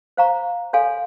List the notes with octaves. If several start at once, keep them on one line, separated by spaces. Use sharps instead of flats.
C5 F5 A#5 C#6
A4 C#5 F5 G#5 C6